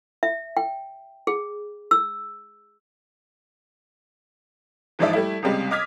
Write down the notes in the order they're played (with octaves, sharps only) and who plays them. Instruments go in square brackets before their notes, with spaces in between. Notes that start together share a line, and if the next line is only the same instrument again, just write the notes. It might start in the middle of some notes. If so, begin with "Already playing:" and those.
[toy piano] E5
G5
G#4
E6
[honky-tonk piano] G#2 E3 F3 G#3 D5 E5
G3 A3 E4
C#2 C3 G3 G#3
D#5 D6 D#6 F6 G#6 B6